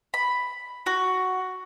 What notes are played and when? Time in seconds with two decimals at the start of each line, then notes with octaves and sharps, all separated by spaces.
0.14 B5
0.86 F#4